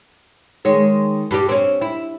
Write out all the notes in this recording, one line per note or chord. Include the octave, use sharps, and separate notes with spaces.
D#3 G#3 C#5
G2 G3 G4
C4 C#4
E4